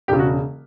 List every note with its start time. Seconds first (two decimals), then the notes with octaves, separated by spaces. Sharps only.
0.08 E1 C#3 G4
0.19 F#4